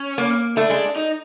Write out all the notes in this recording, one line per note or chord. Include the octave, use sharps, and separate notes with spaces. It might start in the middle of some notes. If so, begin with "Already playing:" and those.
Already playing: C#4
A#3
A3 D4
G#3
D#4